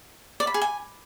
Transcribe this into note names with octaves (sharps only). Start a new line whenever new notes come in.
D5
B5
G#4
G#5